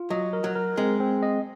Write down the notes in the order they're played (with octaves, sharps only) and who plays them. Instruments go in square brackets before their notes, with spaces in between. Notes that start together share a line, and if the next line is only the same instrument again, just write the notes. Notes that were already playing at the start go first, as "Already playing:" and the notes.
Already playing: [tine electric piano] F4
[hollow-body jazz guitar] F#3 [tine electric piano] D#5
[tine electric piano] A#4
[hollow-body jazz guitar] F#3
[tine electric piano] A#4
[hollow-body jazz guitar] G#3 [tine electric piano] C4
[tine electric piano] C4
D#5